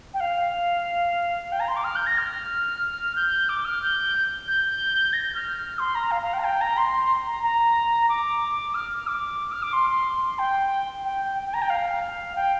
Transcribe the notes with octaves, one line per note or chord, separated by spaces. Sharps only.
G5
F5
G5
A#5
C6
D6
F6
G6
A#6
F6
G6
D6
F6
G6
G6
A#6
G6
F6
C6
A#5
F5
F5
G5
A#5
G5
A#5
C6
A#5
A#5
D6
F6
F6
D6
F6
D6
C6
C6
G5
G5
G5
A#5
G5
F5
G5